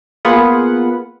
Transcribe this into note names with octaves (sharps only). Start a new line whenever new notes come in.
A#3 B3 F4 G#4 B4 F#5